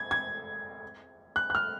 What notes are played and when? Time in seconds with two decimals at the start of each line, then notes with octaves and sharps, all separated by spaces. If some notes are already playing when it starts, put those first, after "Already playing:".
Already playing: G#6
0.11 G#6
1.36 F#6
1.50 F#6
1.55 F6